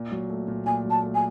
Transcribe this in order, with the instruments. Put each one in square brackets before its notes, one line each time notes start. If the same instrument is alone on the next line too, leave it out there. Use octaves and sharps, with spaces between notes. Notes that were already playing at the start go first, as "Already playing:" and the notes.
Already playing: [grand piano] A#2
F#3
A3
A#2
[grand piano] A#2 [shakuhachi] G#5
[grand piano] F#3
[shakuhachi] A5
[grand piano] A3
[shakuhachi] G#5